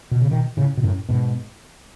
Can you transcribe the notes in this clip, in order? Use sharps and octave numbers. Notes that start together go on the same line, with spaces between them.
B2
C#3
B2 D#3
A2 C#3
B2
F#2 A2
G#2 B2